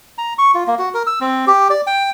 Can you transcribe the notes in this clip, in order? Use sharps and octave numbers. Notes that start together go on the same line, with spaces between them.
A#5
C#6
F4
A#3
F#4
A#4
E6
C4
G4
D5
G5